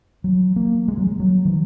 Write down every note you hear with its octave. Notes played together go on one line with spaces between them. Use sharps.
F#3
A#3
G#3
F#3
G#3
F#3
D#3